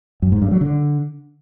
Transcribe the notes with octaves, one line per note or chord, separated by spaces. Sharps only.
F#2
G#2
G2
F#3
D3